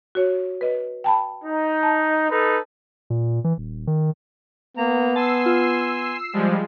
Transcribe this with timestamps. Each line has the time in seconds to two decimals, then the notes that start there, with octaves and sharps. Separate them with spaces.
0.15 F#4 C#5
0.61 B4 D#5
1.04 G5 A5 B5
1.44 D#4
1.83 A5
2.29 D#4 A4 B4
3.10 A#2
3.44 E3
3.58 D#1
3.87 D#3
4.77 A#3 B3 A#5
5.16 G#5 A5 C6 E6 C7
5.46 F4
6.33 F3 G3 G#3